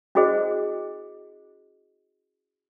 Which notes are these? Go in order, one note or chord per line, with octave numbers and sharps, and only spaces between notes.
C#4 E4 F#4 G#4 C5 D#5